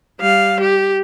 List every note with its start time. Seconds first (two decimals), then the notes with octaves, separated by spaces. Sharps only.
0.20 G3 F5
0.60 G4